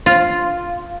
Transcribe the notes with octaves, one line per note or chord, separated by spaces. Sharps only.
F4